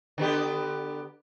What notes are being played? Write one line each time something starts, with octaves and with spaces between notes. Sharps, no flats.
D3 B3 G4